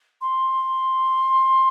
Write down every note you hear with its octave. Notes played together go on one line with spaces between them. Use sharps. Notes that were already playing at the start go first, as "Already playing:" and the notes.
C6